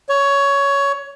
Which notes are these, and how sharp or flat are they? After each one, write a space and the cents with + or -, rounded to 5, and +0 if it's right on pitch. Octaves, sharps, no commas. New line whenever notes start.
C#5 +15